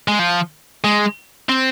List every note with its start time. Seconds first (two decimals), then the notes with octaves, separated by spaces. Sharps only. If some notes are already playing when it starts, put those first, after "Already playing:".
0.08 G#3
0.19 F3
0.84 G#3
1.49 C4